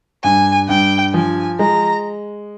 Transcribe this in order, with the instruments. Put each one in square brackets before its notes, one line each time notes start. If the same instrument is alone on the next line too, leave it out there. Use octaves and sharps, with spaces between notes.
[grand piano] G2 [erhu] G#5
[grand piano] G2 [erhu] G5
[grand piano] F3 [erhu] G#5
[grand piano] G#3 [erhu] A#5